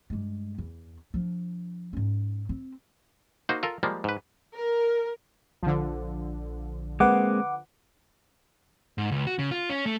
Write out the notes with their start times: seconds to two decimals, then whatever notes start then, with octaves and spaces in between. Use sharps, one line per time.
0.10 G2 G#3
0.58 E2
1.14 F3 D4
1.93 G#2 C#4
2.49 C4
3.49 A#3 D#4 F#4 C5
3.63 F4 A4 A#4
3.83 F3 G3 G#3 A#3
4.04 G#2 B4
4.55 A#4
5.63 A#1 D3 F3
7.00 G#3 A#3 C4 B4 F#5 D6
8.98 G#2
9.11 C#2
9.27 F#4
9.39 C#3
9.51 F4
9.69 C#4
9.86 A3